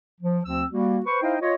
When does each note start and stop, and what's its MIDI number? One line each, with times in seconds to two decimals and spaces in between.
0.21 0.39 53
0.45 0.63 38
0.45 0.63 53
0.45 0.63 60
0.45 0.63 88
0.70 0.99 55
0.70 0.99 58
0.70 0.99 66
1.05 1.19 71
1.05 1.19 72
1.05 1.19 85
1.22 1.36 63
1.22 1.36 64
1.22 1.36 72
1.22 1.36 75
1.22 1.36 77
1.22 1.36 79
1.42 1.54 65
1.42 1.54 73
1.42 1.54 75